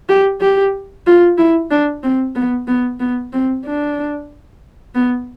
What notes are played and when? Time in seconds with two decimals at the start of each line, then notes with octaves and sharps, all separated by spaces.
0.09 G4
0.41 G4
1.07 F4
1.38 E4
1.71 D4
2.03 C4
2.35 B3
2.67 B3
3.00 B3
3.33 C4
3.65 D4
4.95 B3